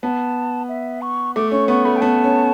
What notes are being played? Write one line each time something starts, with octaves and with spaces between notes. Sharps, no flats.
B3 A5
E5
C#6
A3 D6
C#4 C#6
B3 C#6
A3 B5
G5
B3 A5
C#4